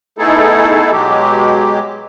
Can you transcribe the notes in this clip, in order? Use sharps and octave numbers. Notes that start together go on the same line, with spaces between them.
A3 B3 D#4 E4 G#4 A4
B2 F#3 G#3 G4